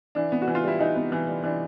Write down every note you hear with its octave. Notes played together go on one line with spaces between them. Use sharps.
E3 D4
B3
F#4
E3
F4
G3 E4
E3 D#4
B3
E3
G3
E3 D4